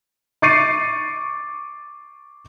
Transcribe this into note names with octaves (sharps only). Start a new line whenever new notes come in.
C#6 D6 A6 C7 C#7 D#7